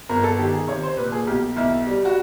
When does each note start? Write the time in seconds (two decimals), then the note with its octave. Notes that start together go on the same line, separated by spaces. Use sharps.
0.09 G1 A#4
0.24 A4
0.39 D#3 G4
0.54 G#4
0.67 C3 C#5
0.83 C5
0.97 A#2 B4
1.12 G#4
1.27 B1 G4
1.56 B1 E4
1.87 G3
2.05 F#4